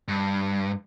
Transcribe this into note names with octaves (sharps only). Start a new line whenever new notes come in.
G2